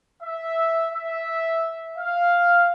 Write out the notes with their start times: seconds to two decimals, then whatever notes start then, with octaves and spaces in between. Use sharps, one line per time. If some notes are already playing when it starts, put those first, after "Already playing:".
0.23 E5
0.91 E5
1.98 F5